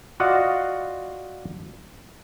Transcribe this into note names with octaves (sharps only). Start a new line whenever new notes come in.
F4 F#4 D5 D#5 F5 F#5